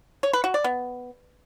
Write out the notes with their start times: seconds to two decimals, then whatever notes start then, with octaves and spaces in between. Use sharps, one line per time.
0.23 C#5
0.33 B4
0.44 F#4
0.54 D5
0.64 B3